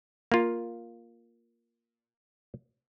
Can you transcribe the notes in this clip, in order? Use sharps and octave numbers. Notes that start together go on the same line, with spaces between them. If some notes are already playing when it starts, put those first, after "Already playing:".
A#3 F4